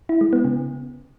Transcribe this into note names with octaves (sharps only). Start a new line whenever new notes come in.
E4
G#3
B3
C#3